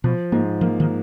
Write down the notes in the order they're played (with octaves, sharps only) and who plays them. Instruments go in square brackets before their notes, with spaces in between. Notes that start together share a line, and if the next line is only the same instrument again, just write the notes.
[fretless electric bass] B2 [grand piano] F3
[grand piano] G#2 [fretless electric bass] A#3
[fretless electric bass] F3 [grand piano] A#3
[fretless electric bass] D#3